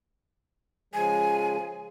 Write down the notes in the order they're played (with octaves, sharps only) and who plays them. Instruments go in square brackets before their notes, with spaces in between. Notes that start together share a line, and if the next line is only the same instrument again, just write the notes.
[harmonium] C#3 F3 G#3 [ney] G#5